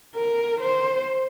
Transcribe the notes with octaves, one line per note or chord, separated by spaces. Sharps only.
A#4
C5